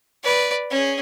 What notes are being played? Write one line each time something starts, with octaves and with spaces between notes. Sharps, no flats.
B4 D5
C#4 G#4